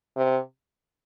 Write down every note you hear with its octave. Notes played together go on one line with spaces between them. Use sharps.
C3